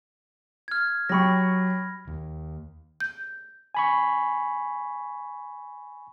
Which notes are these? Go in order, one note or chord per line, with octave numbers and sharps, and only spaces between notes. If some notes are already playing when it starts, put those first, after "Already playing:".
F6 G#6
F#3 G4 B5 C#6 A#6
D#2
G6
G#5 B5 C#6